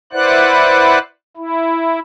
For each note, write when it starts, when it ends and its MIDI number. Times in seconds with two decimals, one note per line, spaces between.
0.13 0.99 64
0.13 0.99 71
0.13 0.99 72
0.13 0.99 74
0.13 0.99 78
0.13 0.99 90
1.37 1.99 64